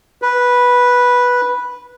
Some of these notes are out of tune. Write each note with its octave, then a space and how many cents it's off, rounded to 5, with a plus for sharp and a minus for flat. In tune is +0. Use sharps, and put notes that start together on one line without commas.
B4 -10